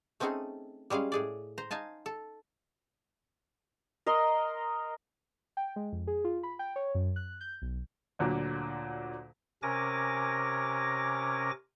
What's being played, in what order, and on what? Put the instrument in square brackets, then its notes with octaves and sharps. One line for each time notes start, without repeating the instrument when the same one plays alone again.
[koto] A3 C4 C#4 D#4 G#4 A4
G3 G#3 C#4 G#4 F5
A2 G#4 D5
C5 A#5
D#4 F5 G#5 A5
A4
[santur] A#4 D#5 C6
[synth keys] G5
G#3
F2
G#4
F4
B5
G5
C#5
F#2
F#6
G6
B1
[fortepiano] D2 A#2 D3 F#3
[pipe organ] C3 C#4 A#4 G#5 D6 A#6